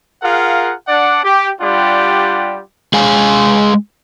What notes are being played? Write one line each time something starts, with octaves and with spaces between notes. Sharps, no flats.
F4 G#4 A#4 F5 F#5
D4 D5 F#5
G4
G3 D4 F4 G4 D5 F#5
G#3 G#4 F5 G#5